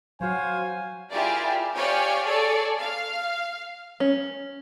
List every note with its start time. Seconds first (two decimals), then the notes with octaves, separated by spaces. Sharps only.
0.21 F#3 F#4 C5 C#5 F5 G#5
1.10 E4 F4 G4 G#4 A#4 D5
1.75 G4 C#5 D5 F5 G5 G#5
2.25 G#4 A4 C#5 D5
2.80 F5
4.00 C#4